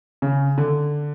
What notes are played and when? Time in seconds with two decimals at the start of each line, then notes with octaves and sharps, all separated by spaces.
0.22 C#3
0.58 D3